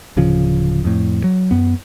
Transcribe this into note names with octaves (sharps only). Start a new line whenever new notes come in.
D1 C#3 F3
F2 A2
F#3
F#2 B3